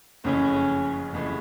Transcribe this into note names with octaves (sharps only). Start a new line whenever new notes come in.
F#1 F2 C#3 E3 A3 C#4
F#1 F2 C#3 E3 A3